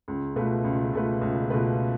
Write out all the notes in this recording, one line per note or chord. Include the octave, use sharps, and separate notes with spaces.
C#2
B2 A3 F4 B4
C#2
B2 A3 F4 B4
C#2
B2 A3 F4 B4